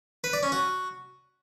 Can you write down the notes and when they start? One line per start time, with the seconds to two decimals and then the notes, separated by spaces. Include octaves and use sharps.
0.24 B4
0.33 D5
0.43 C#4
0.52 F#4